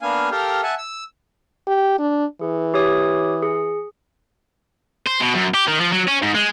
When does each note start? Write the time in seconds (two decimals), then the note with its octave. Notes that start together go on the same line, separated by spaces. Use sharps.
0.02 A#3 B3 D4 F5 G#5
0.31 G4 A4 A#4 F5 G5
0.63 E5 F#5 G#5 A5
0.78 E6
1.67 G4
1.99 D4
2.41 E3 G#4
2.74 G4 C#5 D#6
3.43 G#4
5.06 C5
5.20 B2
5.34 F#2
5.54 G4
5.67 D#3
5.80 F3
5.92 F#3
6.08 C#4
6.23 G#2
6.35 G#3